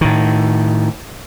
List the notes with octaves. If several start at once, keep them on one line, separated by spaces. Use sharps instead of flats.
A2 D#3